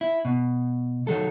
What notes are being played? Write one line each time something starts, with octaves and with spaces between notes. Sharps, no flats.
E4
B2
D#3 F#3 A4